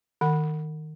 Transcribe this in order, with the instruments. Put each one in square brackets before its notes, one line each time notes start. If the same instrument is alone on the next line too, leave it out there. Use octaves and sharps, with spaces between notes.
[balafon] D#3 F#5